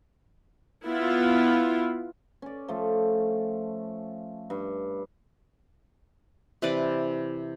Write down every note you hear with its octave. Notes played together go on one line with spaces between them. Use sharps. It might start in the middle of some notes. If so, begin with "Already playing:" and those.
B3 E4 F4
C#4 D5
F3 A3
G2
C3 E3 B4 D5